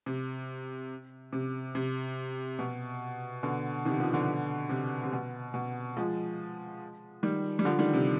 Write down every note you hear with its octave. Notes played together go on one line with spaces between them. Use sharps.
C3
C3
C3
B2
B2 D3
C3 D#3
D3 F3
B2 D3
C3
C3
B2
B2
F3 G#3
D#3 G3
G3
D3 F3
D#3 G3
C3